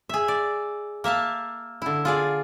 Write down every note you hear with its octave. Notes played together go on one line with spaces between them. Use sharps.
G#4 E5
D5
A#3 E5 F5 A5
D3 E4
F4 G#4 D5